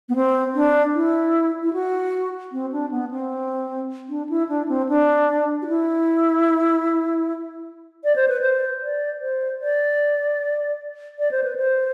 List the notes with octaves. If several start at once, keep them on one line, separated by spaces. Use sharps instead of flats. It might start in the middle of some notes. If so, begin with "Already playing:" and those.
B3
C4
D4
E4
E4
F#4
C4
D4
B3
C4
D4
E4
D4
C4
D4
F#4
E4
D5
C5
B4
C5
D5
C5
D5
D5
C5
B4
C5